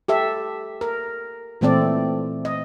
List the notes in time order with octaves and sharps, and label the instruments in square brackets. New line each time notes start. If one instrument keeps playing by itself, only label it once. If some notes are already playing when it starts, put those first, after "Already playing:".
[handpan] G4 A4 E5
A#4
A#2 E3 A3 C4 A4 D5
D#5